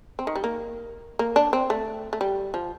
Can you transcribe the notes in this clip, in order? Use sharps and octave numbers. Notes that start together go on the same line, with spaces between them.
C4
D#3
G3
A#3
A#3
D4
C4
A3
A3
G3
F3